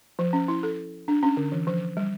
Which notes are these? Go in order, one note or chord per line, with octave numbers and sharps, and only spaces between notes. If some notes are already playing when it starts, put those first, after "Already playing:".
F3
C#4
E4
A4
D4
C#4
D3
E3
F3
G3